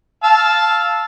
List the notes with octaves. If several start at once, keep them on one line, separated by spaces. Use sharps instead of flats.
F5 A5 E6